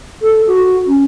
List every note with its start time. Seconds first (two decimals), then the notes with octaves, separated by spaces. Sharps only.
0.22 A4
0.47 F#4
0.87 C#4